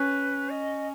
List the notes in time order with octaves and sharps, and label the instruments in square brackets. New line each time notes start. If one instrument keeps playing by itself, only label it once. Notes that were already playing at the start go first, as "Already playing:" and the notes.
Already playing: [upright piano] C#4 [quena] B4
[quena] D#5